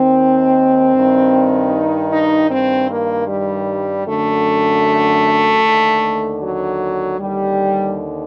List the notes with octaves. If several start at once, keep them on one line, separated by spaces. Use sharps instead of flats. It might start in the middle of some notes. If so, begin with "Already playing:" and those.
Already playing: D#2 D#3 C4
G2 D#3
D#4
D#4
G2 D#3 C4
A#3
G3
F#2 D3 A3
D#2 D3
F#3
D#2 D3 G3